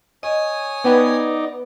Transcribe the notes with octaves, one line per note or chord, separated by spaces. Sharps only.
C#5 D#5 G#5 D#6
B3 D#4 B4 D5 G5